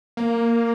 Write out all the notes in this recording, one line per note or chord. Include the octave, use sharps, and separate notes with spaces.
A#3